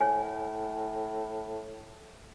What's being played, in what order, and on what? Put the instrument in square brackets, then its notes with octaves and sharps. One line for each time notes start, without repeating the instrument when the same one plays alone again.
[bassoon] A2 [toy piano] C5 C#5 G#5